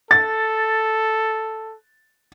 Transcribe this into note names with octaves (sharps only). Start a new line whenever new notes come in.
A4 A6